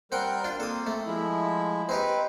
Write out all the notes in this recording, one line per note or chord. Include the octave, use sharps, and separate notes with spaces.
G3 C4 A#4 F#5 G5 G6
D4 F4
A#3 C4 A4 D#6
A3
F3 G#3 E4
C4 D#4 G4 B4